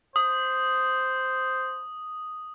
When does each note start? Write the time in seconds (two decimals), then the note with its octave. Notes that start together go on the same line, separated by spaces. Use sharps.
0.16 C5 D#6